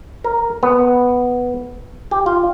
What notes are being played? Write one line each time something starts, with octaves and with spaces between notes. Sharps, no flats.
A#4
B3
G4
F4